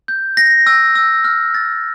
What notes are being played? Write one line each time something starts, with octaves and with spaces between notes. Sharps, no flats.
G6
A#6
E6
E6
F6
A6